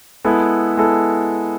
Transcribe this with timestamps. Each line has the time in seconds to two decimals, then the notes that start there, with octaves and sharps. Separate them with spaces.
0.25 G#3 B3 E4 A4
0.77 G#3 B3 E4 A4